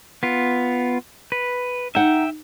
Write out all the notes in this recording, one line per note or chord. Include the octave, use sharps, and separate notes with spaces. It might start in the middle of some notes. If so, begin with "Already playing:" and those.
B3 F4
B4
D#4 E5 F#5 G5